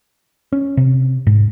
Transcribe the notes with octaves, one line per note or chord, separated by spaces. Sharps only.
C#4
C3
G#2